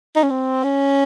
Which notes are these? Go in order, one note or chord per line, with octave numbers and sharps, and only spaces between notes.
D#4
C#4
C4
C#4